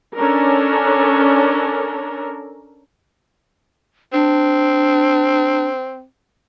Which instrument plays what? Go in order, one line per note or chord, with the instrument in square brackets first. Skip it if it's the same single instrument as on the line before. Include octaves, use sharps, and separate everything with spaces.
[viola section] C#4 D4 A4 A#4
[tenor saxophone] C4 [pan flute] D4